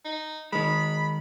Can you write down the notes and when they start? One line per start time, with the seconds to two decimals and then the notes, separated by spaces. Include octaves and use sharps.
0.05 D#4
0.53 D#3 G#3 B5